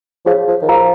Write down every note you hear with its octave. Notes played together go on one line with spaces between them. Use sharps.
F3 G#4 C#5 F5
F3
D#3
F3 A#4 F5 A#5